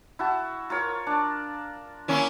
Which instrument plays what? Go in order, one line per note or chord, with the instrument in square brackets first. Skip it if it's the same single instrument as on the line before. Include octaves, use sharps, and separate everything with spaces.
[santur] E4 F#4 A5
F4 A#4 C#5
D4
[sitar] A#3 C#4 E4